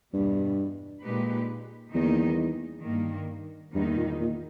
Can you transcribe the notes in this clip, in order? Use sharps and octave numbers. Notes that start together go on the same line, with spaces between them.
E2 G2 B2 G3
A#2 G#3 D#4 G4 B4
E2 D#3 G3 A#3 D#4
G2 D#3 A#3
E2 G2 D#3 G3 A#3 D#4
A#2
A#2